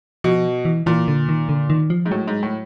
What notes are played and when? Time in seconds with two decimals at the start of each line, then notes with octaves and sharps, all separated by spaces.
0.24 B2 F3
0.65 E3
0.86 A#2 E3
1.08 D3
1.29 D#3
1.49 D3
1.70 D#3
1.90 F3
2.05 G#2
2.11 A2 F#3
2.27 G#2
2.43 A2